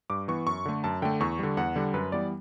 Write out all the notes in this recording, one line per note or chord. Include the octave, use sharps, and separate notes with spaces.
G2 D6
E3 B3 C#6
F#2 C#6
D3 A3
F#2 A5
D3 A3 G5
E2 C#6
D3 G3
E2 F#5
D3 G3
F#2 B4
E3 G3 B3 D5